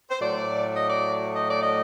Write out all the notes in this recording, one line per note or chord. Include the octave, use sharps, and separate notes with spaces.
C5
A2 F#3 A3 D5
D#5
D5
D#5
D5
D#5